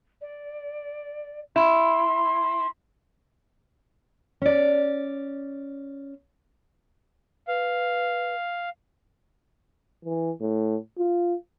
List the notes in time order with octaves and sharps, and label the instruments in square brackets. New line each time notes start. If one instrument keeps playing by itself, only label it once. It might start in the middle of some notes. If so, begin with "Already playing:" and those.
[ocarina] D5
[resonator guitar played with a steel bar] E4 [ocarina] C6
[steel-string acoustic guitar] C#4 D5
[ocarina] B4 [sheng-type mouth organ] F5
[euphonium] E3
A2
F4